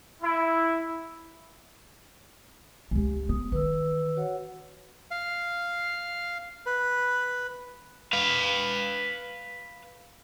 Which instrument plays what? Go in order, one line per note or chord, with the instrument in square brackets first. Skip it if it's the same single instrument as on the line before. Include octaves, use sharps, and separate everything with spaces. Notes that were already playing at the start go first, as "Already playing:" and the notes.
[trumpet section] E4
[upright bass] C#2 C#3 [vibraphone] G#3 G4
[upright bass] B3 [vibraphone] D#6
[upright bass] D#3 E3 [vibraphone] B4 E6
[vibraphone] F#4 C#5 F#5
[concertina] F5
B4
[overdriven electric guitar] B4 F5